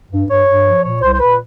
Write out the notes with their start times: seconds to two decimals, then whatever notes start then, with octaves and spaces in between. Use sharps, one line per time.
0.11 G2
0.28 G2 C#5
0.47 G2
0.66 F3
0.83 A#2 C#5
1.02 C2 C5
1.13 C5
1.20 A#2 B4